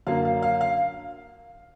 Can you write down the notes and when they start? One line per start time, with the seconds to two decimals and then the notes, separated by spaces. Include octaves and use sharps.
0.07 F#2 D3 F#3 A#3 F5
0.25 F5
0.42 F5
0.61 F5